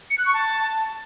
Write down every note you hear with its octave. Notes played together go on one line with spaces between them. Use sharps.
C#7
F#6
C#6
A5